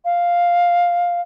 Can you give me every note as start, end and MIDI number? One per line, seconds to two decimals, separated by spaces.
0.05 1.21 77